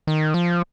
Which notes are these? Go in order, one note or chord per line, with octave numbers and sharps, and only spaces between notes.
D#3
F3